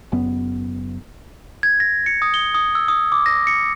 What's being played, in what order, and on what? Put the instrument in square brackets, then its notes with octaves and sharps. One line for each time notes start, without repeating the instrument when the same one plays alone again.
[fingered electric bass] F#1 F#2 B3
[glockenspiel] G#6
A#6
C#7
D#6
G7
D#6
E6
D#6
D6
A#6
C#7